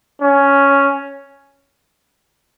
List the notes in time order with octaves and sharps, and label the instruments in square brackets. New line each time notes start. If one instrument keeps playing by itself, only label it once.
[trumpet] C#4